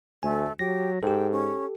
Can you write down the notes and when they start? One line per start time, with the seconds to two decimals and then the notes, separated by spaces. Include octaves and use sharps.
0.23 D2 A3 G#5
0.59 F#3 G4 A#6
1.03 G#2 G4 A4 G5
1.32 C#4